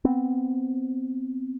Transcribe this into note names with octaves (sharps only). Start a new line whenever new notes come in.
B3 C4